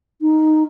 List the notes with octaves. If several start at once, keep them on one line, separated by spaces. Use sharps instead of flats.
D#4